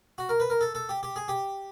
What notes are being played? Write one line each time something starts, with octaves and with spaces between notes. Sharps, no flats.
F#4
A#4
B4
A#4
A4
A4
G4
G4
G#4
G4